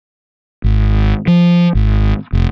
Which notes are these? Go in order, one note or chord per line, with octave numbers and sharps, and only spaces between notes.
G#1
F3
G#1
F1